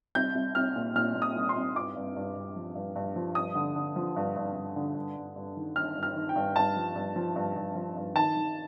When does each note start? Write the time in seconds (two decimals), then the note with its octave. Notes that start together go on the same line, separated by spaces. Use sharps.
0.15 C2 G6
0.35 C2
0.55 C2 F6
0.76 A#2
0.95 A#2 F6
1.15 A#2
1.22 D#6
1.36 C2
1.49 C6
1.56 C2
1.76 G2 D6
1.96 G2
2.16 G2
2.35 G2
2.56 F3
2.75 G2
2.96 G2
3.16 F3
3.35 G2 D#6
3.55 D3
3.76 D3
3.96 F3
4.16 G2
4.36 G2
4.56 G2
4.76 D3
4.96 G2
5.16 G2
5.36 G2
5.56 D#3
5.76 D#3 F6
5.97 G2
6.03 F6
6.15 D#3
6.29 G5
6.36 G2
6.56 G2 A5
6.76 F3
6.96 G2
7.16 F3
7.36 G2
7.56 G2
7.75 F3
7.96 G2
8.16 D#3 A5
8.36 D#3